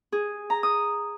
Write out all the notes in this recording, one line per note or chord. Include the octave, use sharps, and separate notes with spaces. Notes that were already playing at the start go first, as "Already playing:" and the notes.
G#4
A#5
D#6